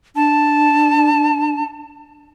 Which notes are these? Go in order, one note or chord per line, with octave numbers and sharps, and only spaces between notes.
D4 A5